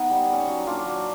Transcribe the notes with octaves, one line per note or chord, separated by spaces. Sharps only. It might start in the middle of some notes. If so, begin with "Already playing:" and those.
Already playing: B3 D#4 F#5
G3
A#3 C#4
F#3
A#3 D4 F4
F#3